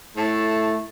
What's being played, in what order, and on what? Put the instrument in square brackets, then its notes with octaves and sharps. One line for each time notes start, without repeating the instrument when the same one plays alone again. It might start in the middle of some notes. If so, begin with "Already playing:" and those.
[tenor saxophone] A2 [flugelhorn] A3 [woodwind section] A5